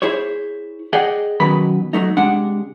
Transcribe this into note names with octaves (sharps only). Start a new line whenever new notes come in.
E4 G#4 C5 C#5
G#4 D5 D#5 F#5 G5
F#2 B2 D#3 F#3 B4 B5
F#3 G#3 A3 D#4
C3 G#3 D4 F#5